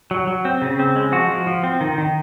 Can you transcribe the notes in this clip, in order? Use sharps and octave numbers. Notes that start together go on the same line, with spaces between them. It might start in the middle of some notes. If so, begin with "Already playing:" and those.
F#3
F#3
C4
C#3
C4
G#3
F3 F#4
F3
F3
C4
D#3
D#3